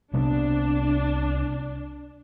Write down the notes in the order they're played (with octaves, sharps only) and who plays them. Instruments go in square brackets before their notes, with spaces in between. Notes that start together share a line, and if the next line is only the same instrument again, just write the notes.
[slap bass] C2 C3 G3 B3 [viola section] D4